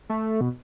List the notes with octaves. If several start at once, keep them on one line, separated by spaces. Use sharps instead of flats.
A3
B2